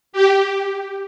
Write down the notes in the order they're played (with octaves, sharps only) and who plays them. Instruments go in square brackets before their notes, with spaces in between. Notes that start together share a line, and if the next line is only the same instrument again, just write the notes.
[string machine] G4